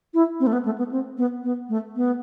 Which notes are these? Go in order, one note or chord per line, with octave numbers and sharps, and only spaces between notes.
E4
C4
A3
B3
A3
B3
C4
B3
B3
A3
B3